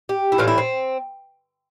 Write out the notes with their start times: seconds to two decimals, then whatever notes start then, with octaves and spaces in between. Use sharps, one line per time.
0.09 G4
0.32 E4
0.38 A2 E3 G3 F4
0.48 E4
0.58 C4